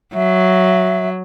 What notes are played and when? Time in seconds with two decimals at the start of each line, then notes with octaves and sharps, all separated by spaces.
0.15 F#3 E5